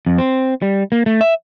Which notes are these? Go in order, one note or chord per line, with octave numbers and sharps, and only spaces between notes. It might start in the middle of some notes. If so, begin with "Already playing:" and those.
F2
C4
G3
A#3
A3
E5